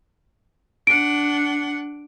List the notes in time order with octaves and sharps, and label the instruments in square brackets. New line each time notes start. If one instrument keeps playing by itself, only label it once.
[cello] D4 F#5 [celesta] D7